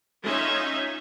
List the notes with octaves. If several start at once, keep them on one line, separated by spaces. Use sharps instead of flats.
C#4 D#4 F4 E5